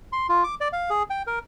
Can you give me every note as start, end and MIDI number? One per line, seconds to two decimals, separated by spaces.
0.12 0.27 84
0.29 0.44 65
0.44 0.55 86
0.61 0.68 74
0.73 0.90 77
0.90 1.03 68
1.10 1.22 79
1.27 1.39 70